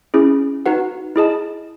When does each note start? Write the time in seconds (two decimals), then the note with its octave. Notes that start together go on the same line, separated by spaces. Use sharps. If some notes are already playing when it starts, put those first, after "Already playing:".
0.14 C#4 E4 G#4
0.66 D#4 F#4 B4 F#5
1.16 E4 G#4 D#5 A5